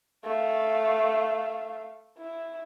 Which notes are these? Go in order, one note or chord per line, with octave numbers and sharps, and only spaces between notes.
A3 F5
E4